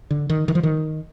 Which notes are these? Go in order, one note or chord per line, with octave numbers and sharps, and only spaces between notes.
D3
D#3
D#3
F3
D#3